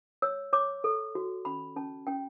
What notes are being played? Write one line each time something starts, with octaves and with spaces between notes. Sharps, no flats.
C#5 E6
C#5 D6
A4
F#4
C#4 B5
C#4 A5
C#4 G5